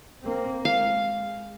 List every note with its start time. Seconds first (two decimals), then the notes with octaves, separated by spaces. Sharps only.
0.23 A#3 C4
0.65 G#3 F5